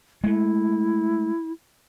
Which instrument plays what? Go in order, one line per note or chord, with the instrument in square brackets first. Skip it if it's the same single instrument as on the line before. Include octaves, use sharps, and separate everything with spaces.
[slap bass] G#3 A3 [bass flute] E4